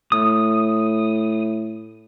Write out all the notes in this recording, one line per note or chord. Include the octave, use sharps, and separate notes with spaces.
A2 D#6